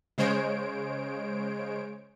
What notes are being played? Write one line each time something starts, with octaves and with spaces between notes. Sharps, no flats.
C#3 G#3 C5 C#5 D7